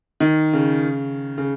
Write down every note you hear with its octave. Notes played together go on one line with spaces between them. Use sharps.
D#3
C#3
C#3